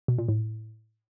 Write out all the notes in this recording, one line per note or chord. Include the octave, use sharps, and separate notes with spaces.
B2
A#2
A2